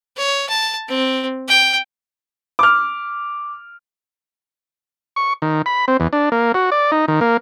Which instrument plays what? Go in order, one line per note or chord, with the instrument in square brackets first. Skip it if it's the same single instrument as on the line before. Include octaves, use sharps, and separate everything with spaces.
[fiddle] C#5
A5
C4
G5
[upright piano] D6 F6
[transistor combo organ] C#6
D#3
B5
C4
E2
D4
A#3
F#4
D5
D#4
D#3
A#3